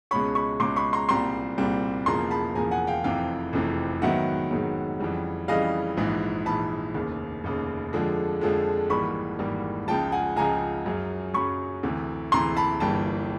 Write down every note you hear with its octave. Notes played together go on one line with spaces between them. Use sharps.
C#2 B2 G#3 C#4 B5 C#6
B5 C#6
C#2 B2 G#3 C#4 C6 D6
B5 C#6
A#5 C6
C2 A#2 G3 C4 A#5 C6
C2 A#2 G3 C4
E1 E2 C#3 F3 A#3 A#5 C6
A5 B5
E1 E2 C#3 F3 A#3 G#5 A#5
F#5 G#5
F5 G5
F1 F2 C3 E3 F5 G5
F1 F2 C3 E3
G#2 D#3 F#3 B3 E5 F#5
G#2 D#3 F#3 B3
F2 C#3 E3 G3
F2 C#3 E3 G3 D#5 F5
A#1 G#2 E3
A#1 G#2 E3 A5 B5
F1 D#2 C#3
F1 D#2 C#3
F2 D3 F3 G#3
F2 D3 F3 G#3
G#1 G#2 E3 G3 A#3 B5 C#6
G#1 G#2 E3 G3 A#3
C#2 C#3 F3 G5 A5
F#5 G#5
C#2 C#3 F3 G#5 A#5
F#2 C#3 F#3
F#2 C#3 F#3 B5 C#6
D2 C3 E3
D2 C3 E3 A#5 C6
A5 B5
G1 G2 E3 G3 A#3 G5 A5